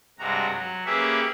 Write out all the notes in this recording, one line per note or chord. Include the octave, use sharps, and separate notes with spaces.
G2 C3 G#3 F#4 A#5
F#3
A#3 C#4 G4 G#4 B4 E5